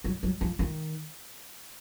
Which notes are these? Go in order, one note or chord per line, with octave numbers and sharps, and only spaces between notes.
F#3
F#3
F3
D#3